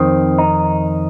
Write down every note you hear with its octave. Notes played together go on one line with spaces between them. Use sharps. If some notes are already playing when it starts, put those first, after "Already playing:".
Already playing: F2 D#3 C4
D#4